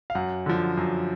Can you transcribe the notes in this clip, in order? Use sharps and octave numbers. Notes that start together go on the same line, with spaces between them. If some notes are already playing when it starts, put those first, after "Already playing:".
F5
F#2 F#5
D3 F3
F#2